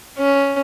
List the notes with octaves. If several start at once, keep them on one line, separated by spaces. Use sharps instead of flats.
C#4